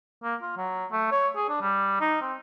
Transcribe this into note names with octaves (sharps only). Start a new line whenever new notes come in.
A#3
F4
F#3
A3
C#5
G#4
D4
G3
D#4
C4